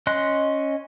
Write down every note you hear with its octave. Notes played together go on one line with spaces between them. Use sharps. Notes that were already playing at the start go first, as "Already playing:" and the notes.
C#4 D#5 C6 F#6